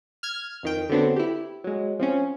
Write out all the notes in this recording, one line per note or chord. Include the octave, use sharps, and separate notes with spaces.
F6 G#6
F2 D#3 G5
D3 F#3 B3 C4 D4
E4 G4
F#3 G#3
F3 C4 C#4